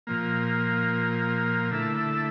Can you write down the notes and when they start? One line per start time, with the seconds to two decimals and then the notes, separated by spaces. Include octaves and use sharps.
0.07 A#2 F3 A#3
1.71 D3 A3 E4 A4 E5